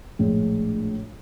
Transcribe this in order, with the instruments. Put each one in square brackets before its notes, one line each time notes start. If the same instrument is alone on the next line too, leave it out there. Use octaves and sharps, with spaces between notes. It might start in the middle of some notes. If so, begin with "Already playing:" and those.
[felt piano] A#1 A2 G#3